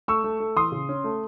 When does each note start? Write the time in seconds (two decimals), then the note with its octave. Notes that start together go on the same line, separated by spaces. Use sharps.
0.08 A3 C#6 E6
0.24 A3
0.40 A3
0.56 E3 C6 D#6
0.72 C#3
0.89 C#4
1.04 A3